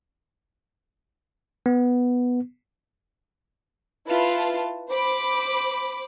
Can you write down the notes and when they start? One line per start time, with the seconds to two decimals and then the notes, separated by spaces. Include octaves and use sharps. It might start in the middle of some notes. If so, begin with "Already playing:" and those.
1.66 B3
4.07 E4 F4 B4 A5
4.90 C5 B5 D6